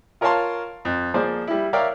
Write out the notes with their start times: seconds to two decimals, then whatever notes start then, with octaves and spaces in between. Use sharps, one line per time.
0.21 F4 A#4 C#5 F5 A5 C6
0.85 F2
1.14 F3 A#3 G#4 C5 D5
1.47 G3 E4
1.73 A#4 C#5 D5 E5 F5 G5